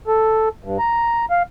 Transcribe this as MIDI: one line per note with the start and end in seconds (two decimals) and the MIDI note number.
0.07 0.49 69
0.64 0.78 43
0.79 1.25 82
1.30 1.43 77